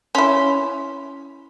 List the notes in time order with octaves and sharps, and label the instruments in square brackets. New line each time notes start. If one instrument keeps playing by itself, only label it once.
[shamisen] C#4 E4 [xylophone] C6